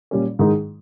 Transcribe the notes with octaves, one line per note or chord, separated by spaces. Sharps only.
A#2 G3 C#4
G#2 D#3 G#3 D#4